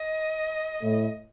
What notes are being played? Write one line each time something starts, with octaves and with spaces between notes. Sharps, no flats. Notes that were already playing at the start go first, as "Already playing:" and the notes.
Already playing: D#5
A2 A3